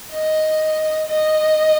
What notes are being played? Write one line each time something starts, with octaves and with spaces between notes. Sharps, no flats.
D#5
D#5